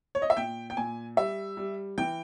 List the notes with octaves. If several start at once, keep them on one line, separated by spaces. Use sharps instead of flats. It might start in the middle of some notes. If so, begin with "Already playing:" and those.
C#5
D#5
E5
A#2 G5
G5
A#2 G#5
G3 E5
G3
E3 G5